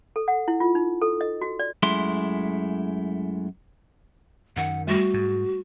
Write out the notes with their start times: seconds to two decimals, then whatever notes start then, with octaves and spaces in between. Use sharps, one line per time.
0.16 A4
0.28 F#5
0.48 E4
0.60 F4
0.75 D#4
1.02 A4
1.21 D#5
1.41 F#4
1.59 D5
1.83 F#2 G#3 A3 E4 C6
4.57 F#2 D#3 F#5
4.87 G3 A3 F#4
5.14 G#2